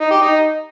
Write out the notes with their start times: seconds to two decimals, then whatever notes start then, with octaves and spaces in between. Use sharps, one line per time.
0.01 D#4
0.11 G4
0.22 D#4